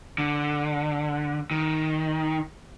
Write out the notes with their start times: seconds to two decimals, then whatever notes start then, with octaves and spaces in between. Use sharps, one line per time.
0.18 D3
1.51 D#3